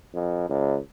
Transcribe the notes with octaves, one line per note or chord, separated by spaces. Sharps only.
F2
C#2